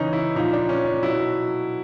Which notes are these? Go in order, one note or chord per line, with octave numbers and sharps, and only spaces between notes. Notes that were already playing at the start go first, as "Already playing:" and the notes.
Already playing: C#3 E3 C#4 D#4
E4
A#2 F3 D#4
D4
C#4
D4
B2 F#3 E4